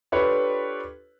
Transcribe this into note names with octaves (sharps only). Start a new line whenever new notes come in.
D4 F4 G4 A4 B4 C#5